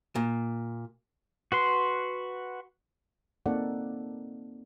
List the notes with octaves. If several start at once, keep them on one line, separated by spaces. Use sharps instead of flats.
A#2
F#4 B4 C6
A#3 C4 D#4 A4 D5 F#5